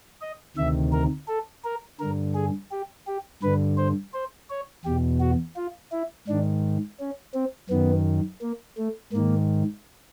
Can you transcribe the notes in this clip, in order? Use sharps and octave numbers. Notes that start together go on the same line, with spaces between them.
D#5
D2 C3 D#3 E5
A#4
A4
A#4
G2 D3 A#4
G#4
G4
G4
G2 D3 B4
C5
C5
C#5
E2 B2 G4
F#4
F4
E4
G#2 D#3 D4
C#4
C4
F#2 D#3 B3
A#3
A3
G#2 D#3 A#3